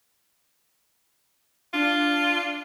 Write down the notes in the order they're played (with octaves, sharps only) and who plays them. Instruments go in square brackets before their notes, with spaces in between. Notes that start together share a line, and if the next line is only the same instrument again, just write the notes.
[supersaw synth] D4 [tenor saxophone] F4